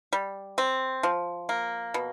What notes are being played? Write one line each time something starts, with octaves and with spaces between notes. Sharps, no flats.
G3
C4
F3
A#3
B2